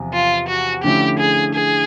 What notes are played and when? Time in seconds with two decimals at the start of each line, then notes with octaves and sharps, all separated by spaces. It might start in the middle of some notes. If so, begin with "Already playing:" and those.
Already playing: E2 C3 F3
0.13 F4
0.48 F#4
0.83 D3 F3 A3 C#4 E4 G4
1.19 G#4
1.54 G#4